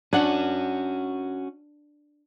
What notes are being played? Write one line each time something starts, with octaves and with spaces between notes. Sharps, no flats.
C#4 D4 F#4 F#5